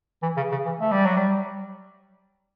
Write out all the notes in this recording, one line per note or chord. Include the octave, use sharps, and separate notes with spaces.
E3
C#3
C#3
E3
A3
G3
F#3
G3